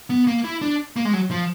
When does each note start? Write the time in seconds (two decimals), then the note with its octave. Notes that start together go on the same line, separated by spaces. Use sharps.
0.10 B3
0.27 A#3
0.44 E4
0.62 D4
0.96 A#3
1.05 G#3
1.13 F#3
1.31 F3